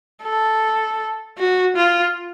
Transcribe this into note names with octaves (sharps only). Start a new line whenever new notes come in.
A4
F#4
F4